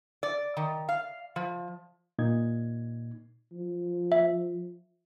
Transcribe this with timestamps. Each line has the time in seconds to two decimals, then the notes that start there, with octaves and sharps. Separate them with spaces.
0.23 D5
0.57 D#3
0.89 F5
1.36 F3
2.19 A#2 D#4 G#6
3.53 F3
4.12 E5